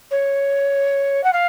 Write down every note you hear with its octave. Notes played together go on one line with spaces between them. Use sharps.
C#5
F#5
F5